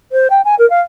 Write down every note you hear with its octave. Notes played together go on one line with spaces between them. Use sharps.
C5
G5
G#5
A#4
F5